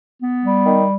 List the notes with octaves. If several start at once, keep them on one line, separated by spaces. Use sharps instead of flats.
B3
G3
D#3